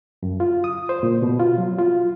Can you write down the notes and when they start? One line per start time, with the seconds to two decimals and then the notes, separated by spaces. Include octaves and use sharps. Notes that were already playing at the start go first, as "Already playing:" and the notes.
0.23 F#2
0.40 F4
0.64 D#6
0.89 C5
1.03 A#2
1.23 B2
1.40 F4
1.58 F#3
1.79 F4